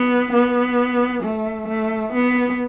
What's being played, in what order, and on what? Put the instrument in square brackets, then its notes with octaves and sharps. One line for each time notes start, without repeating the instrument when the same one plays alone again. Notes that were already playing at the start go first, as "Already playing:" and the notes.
Already playing: [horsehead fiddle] B3
B3
A3
A3
B3